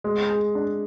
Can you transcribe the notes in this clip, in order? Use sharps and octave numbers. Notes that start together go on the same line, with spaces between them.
G#3
G#4
D4